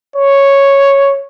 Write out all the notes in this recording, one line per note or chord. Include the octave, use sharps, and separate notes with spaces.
C#5